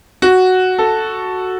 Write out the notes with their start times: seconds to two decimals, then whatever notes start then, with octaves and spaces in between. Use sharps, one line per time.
0.22 F#4
0.78 A4